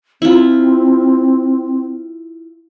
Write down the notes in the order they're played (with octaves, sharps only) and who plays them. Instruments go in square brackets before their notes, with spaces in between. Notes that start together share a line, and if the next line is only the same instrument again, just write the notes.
[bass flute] C4 [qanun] E4 F4